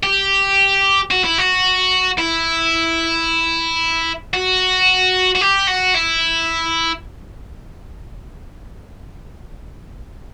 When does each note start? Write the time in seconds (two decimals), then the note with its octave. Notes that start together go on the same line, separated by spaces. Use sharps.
0.03 G4
1.11 F#4
1.24 E4
1.39 F#4
2.18 E4
4.33 F#4
5.35 F#4
5.41 G4
5.68 F#4
5.94 E4